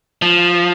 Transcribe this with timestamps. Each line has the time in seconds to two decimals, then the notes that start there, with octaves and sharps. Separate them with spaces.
0.22 F3